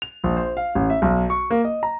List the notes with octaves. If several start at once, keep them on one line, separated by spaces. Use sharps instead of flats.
F7
A#1
C5
F5
A1
E5
B1
C#6
A#3
D#5
A#5